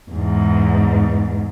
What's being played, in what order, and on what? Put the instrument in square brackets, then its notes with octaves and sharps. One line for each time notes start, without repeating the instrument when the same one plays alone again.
[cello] E2 G#2